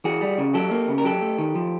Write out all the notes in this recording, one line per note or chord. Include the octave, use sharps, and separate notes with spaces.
E3 F#4 G#4
G3
C#3
F#3 G4 A4
A#3
C#3
A#4
F#3 G4 A4
A3
D#3
F3